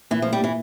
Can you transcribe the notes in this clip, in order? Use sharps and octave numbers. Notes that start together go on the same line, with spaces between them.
A#2 E3
F3 A3
G3
A#2 E3